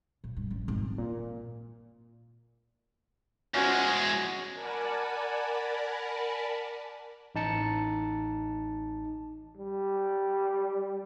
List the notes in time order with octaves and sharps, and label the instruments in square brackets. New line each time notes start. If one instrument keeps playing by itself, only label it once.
[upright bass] A#2
G2
A1
G#1
[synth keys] A#2
[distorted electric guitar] E2 G#3 [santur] C#4 F#4 C5
[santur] F#5
[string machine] A#4 D5 F#5 G#5 A5 B5
[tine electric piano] A1 D#4 A5 C#7
[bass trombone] G3